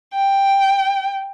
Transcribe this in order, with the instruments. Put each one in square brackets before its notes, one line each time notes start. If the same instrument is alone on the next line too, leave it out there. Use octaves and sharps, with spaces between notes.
[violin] G5